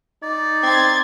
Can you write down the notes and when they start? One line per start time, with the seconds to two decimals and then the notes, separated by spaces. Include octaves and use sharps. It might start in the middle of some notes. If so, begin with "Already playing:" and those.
0.23 D#4 D5
0.63 C4 C6 G#6 A6